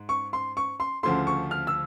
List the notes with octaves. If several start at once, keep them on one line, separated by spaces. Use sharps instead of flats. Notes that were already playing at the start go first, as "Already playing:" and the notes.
Already playing: G#2
C#6
C6
C#6
C6
D2 C#3 F3 A3 C6
C#6
F6
E6